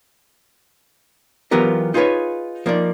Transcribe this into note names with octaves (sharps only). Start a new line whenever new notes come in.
E3 F#3 B3 F4 G4 A#4
D#4 F4 G#4 A4 B4 C#5
F3 A#3 D#4 D5